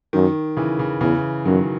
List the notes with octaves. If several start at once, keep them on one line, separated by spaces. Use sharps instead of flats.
F#2 D#3
C#3 E3
C#3 E3
E2 C#3 E3
F#2 D#3 F#3